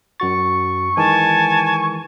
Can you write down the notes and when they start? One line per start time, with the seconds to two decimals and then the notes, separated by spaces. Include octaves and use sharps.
0.20 F#2 F#4 C#6 A6
0.97 D#3 E3 G#3 G#5 A5